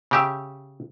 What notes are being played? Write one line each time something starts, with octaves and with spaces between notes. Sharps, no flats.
C#3 G4 E5